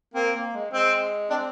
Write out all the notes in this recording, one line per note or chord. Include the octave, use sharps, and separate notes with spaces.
A#3 C4
A#3
G#3
G#3 C4
C4 D4